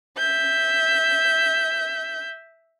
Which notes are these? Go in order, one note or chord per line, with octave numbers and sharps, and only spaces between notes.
E5 G6